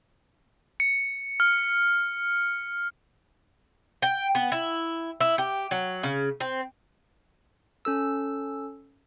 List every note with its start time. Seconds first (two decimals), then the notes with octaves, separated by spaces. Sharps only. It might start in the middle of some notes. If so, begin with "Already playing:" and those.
0.80 C#7
1.40 F6
4.02 G5
4.35 B3
4.52 E4
5.21 E4
5.38 G4
5.71 F#3
6.03 C#3
6.40 C4
7.85 C#4 A4 E6